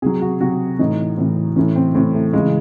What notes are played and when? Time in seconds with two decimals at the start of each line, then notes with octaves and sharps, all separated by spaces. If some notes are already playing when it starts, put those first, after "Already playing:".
0.02 C3 F#3 G#4
0.21 F#4
0.40 C3 F#3 F#4
0.79 A2 E3 D#4
1.17 A2 E3
1.56 A2 E3 C#4
1.76 C4
1.94 A2 E3 C4
2.14 A3
2.33 C#3 E3 G#3